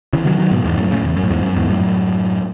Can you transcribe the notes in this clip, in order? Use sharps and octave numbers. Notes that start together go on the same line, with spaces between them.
C#3 E3
D#3 F#3
D#3 F#3
G#2 B2
E2 G#2
F#2 A2
A2 C#3
E2
F#2
A2
E2 G#2
F#2
E2 G#2
F#2 A2